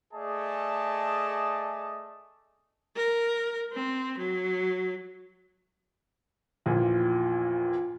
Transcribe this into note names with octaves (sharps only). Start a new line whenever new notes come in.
A3 G#4 D5 D#5 A5
A#4
C4
F#3
A#1 E2 A#2